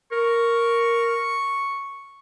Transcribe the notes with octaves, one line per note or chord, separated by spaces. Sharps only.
A#4 C#6